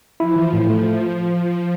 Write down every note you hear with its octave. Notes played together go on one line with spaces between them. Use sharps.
F3 E4
E3
A2
A3